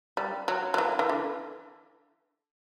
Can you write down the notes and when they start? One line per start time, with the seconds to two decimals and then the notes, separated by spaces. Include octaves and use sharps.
0.17 G3
0.48 F#3
0.74 F#3
0.78 E3
0.99 E3
1.09 D3